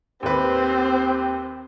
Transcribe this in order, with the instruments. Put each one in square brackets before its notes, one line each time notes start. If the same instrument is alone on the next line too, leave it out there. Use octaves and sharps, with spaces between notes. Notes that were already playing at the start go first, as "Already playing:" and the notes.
[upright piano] D#2 B4 [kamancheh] C4 [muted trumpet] G4